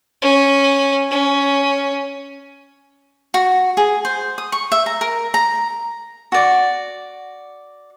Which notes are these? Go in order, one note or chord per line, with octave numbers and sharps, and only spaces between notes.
C#4
C#4
F#4
G#4
C5
D#6
C#6
E5
A#5
A#4
A#5
F#4 D5